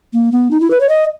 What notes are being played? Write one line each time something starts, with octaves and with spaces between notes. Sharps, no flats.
A#3
B3
D#4
E4
B4
C#5
D#5